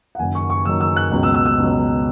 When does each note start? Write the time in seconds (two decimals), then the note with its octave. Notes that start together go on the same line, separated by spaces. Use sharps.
0.15 F#5
0.19 F#1 F#2 D#3 F#3 G#5
0.35 C#6
0.50 C#6
0.65 F#1 F#2 D#3 F#3 E6
0.81 E6
0.96 F#6
1.11 C#2 B2 F#3
1.23 E6
1.34 E6
1.46 E6
1.58 C#2 B2 F#3